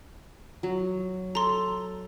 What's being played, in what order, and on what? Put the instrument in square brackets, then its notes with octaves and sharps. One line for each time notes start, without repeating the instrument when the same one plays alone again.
[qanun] F#3
[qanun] A4 [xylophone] A#5 C6